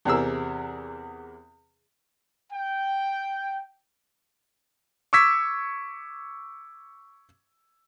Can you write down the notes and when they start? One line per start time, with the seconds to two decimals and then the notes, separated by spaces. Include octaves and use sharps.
0.05 E2 C3 G#4 A#4 E6
2.52 G5
5.13 C#6 D6 E6 G#6 B6